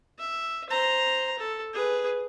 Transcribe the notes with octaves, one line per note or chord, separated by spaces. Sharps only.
E5
C5 A#5
A4
G#4 B4